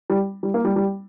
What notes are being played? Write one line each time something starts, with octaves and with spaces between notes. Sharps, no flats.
G3
G3
A#3
G3
G3